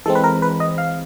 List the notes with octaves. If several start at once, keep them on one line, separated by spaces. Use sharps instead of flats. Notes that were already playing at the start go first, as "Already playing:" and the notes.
E3 G#3 C4 A4
B4
A#4
B4
D#5
F5